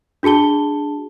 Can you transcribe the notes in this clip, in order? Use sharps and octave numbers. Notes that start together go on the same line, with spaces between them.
D4 F#4 G#4 A5 G7